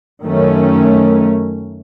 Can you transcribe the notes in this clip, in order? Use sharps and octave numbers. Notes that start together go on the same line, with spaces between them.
F#2 D#3 A3 C#4